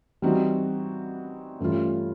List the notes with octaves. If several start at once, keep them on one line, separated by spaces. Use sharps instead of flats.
E3 G3 C4 D#4 F#4
G2 E3 A3 C#4 F4